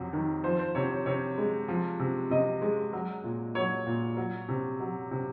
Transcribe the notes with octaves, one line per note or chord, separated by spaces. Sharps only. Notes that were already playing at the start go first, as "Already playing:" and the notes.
Already playing: F2 C3 F#3
D#3
F3 C5
C5
C3 C#5
C#5
C3 C#5
G#3
F3
C3
C3 D#5
G#3
F#3
A#2
F#3 C#5
A#2
F#3
C3
F#3
C3